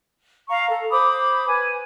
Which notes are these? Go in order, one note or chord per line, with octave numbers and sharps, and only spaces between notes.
F5 A#5 C#6
A4
C5 B5 D6 D#6
B4 G#5